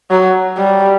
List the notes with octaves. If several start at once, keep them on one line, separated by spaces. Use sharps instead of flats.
F#3
G3